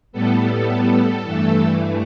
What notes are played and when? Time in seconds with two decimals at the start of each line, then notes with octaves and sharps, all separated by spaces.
0.12 A2 G3 B3 A4
1.23 G2 E3 A3